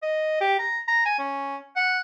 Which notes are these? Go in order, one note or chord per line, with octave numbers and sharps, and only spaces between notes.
D#5
G4
A#5
A#5
G#5
C#4
F#5